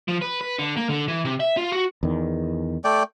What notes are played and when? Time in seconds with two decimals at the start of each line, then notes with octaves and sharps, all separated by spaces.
0.08 F3
0.22 B4
0.41 B4
0.58 D3
0.77 A#3
0.89 D3
1.08 E3
1.25 C3
1.40 E5
1.57 F4
1.72 F#4
2.03 E2 D#3
2.84 A3 D5 G5